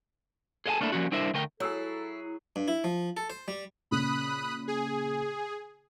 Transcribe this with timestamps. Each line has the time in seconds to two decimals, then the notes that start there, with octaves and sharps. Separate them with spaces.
0.66 G#4 A4 D#5 F5 G#5 A5
0.81 A3 A#3 D4 E4 F#4 A4
0.92 F3 G3 A#3 C#4 F#4
1.12 G3 D4 E4 A#4 C5 E5
1.34 D2 A3 A#4 G5
1.60 F#3 E4 G#4 A4 C#5 E6
2.56 G2
2.68 E4
2.84 F3
3.17 A4
3.30 C5
3.48 G3
3.91 A#2 C#3 A#3 B5 D#6 F#6
4.68 G#4